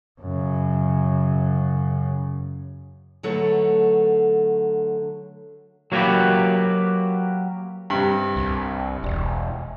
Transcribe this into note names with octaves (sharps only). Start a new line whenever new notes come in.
F#2 C#3
D3 F#3 A3 A4 B4
F#3 A#3 F#4 G4 B4
G2 C3
C2
E1